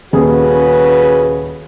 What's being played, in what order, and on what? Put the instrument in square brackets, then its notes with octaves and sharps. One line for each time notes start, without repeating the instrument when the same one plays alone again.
[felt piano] D#1 G#4 [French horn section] C#3 F#4 B4